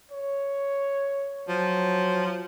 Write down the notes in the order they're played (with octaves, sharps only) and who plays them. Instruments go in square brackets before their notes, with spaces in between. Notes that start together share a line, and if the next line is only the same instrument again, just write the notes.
[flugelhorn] C#5
[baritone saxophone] F3 [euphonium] F#3